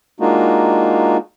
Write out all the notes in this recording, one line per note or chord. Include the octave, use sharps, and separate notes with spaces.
G#3 A#3 D4 D#4 F4 F#4